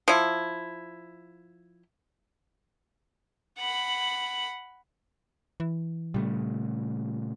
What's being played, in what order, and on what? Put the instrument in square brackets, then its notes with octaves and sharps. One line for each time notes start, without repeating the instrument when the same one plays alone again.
[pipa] F3 E4
[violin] F#5 B5
[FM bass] E3
[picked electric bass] A#2 C#3 A3 [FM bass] G3